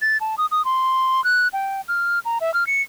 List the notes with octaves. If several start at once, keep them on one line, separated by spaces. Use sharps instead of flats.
A6
A5
D#6
D#6
C6
F#6
G5
F6
A#5
E5
F6
C#7